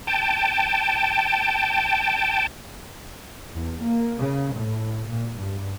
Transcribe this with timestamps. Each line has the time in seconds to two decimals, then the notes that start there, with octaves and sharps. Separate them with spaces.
0.07 G5 A5
3.54 E2
3.83 A#3
4.18 C#3
4.56 A2
5.08 A#2
5.37 G2